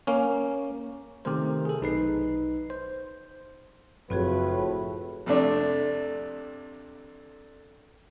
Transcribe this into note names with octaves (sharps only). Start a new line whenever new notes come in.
A#3 C#4
C3 D#3 A3 A#4 C5
G#4 A4
B1 D#4 B4 C7
C5
F#1 A2 F3 C4 F#4 G#4 B4
F2 C3 A3 D4